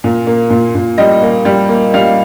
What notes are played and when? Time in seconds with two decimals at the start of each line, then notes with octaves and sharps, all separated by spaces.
0.04 A#2
0.27 A#3
0.50 A#2
0.75 A#2
0.98 G3 D#5
1.22 A#3
1.45 G3
1.69 A#3
1.94 G3 F5